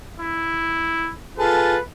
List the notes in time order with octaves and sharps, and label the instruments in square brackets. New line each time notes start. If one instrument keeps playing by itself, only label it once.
[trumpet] E4
[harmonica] F4 G#4 A4 [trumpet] B4